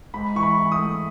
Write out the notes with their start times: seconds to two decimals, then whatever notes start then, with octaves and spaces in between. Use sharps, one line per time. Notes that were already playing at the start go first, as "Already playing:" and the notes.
0.14 G#2 B5
0.36 E3 C#6
0.43 B5
0.57 E3
0.72 D#6
0.79 A3